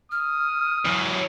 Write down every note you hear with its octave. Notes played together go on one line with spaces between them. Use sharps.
D#6 F6
E3 F#3